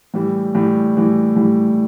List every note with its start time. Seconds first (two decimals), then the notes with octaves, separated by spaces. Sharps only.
0.14 A2 E3 G3
0.55 A2 E3 G3
0.95 A2 E3 G3
1.36 A2 E3 G3